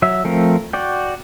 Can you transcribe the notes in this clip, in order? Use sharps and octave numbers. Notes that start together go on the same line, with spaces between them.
F#3 E5
F3 A3 C4 A#4
F#4 D5 G5